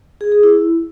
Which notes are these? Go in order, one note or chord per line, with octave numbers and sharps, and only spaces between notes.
G#4
G#4
E4